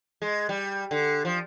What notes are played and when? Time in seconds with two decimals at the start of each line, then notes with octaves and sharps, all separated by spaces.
0.22 G#3
0.49 G3
0.91 D3
1.25 F3